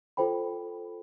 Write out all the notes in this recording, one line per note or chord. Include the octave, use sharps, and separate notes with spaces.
F4 A4 C5 G5 B5